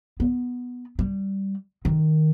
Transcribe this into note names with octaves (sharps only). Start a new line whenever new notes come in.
B3
G3
D#3